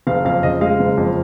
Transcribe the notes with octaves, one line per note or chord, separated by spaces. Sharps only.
F#1 F5
F2 F5
C#3 D#5
G#3 F5
F#1
F2